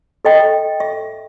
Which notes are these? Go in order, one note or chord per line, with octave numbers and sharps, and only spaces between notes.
A4 D#5 G5
E5